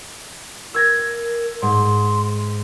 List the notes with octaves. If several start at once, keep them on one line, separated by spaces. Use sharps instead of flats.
A#4 E6 G#6 A#6
G#2 C6